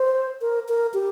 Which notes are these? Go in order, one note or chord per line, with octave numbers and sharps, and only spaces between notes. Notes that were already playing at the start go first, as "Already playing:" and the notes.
Already playing: C5
A#4
A#4
G4